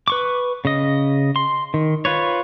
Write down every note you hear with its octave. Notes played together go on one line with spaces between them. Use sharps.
B4 C#6 D6
C#3 D#5
C6
D#3
F4 B4 C#5